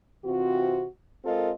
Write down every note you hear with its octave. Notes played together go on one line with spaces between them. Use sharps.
C3 E3 C4 F4 F#4
G#3 C4 F4 A4 A#4 D#5